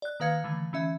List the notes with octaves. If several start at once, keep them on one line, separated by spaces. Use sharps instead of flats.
D5 F#6
D#3 A#3 B4 F5 G#6 C#7
D3 E3 A3
E3 C#4 E5